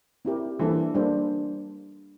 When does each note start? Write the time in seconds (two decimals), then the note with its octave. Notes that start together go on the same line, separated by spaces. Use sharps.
0.25 C4 E4 G4 A#4
0.59 E3 G3 A#3 D4 A4 C5
0.94 G3 A#3 D4 A4 C5